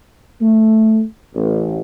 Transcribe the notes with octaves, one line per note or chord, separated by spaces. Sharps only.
A3
A1